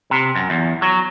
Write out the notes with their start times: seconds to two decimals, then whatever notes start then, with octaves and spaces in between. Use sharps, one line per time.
0.11 C3
0.35 F#2
0.50 E2
0.82 F#3